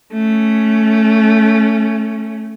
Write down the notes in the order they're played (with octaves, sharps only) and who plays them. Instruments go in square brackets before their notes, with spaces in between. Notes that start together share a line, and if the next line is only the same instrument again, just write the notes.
[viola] A3 C#4